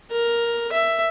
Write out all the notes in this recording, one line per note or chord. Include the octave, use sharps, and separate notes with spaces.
A#4
E5